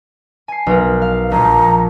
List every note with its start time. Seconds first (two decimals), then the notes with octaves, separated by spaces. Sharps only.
0.48 G#5 C7
0.66 B1 B3 A#4
1.02 F5
1.32 A#1 G#3 A#5